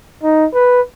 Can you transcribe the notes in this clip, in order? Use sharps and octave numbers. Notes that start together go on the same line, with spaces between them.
D#4
B4